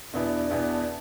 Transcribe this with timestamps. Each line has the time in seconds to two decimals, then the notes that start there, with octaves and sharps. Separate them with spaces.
0.13 E2 B2 B3 D4 E4
0.51 E2 B2 B3 E4